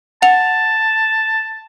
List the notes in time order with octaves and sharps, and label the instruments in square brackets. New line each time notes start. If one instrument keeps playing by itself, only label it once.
[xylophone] F#5 F7 [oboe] A5